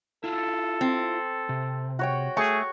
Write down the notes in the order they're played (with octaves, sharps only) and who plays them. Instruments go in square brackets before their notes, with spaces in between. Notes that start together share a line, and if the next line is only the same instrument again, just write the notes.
[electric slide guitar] E4 F4 [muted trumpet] A4
[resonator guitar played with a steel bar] C4
[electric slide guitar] C3
[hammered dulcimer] F#4 C#5 G5
[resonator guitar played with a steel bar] A3 [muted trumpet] G#4 [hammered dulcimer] C#6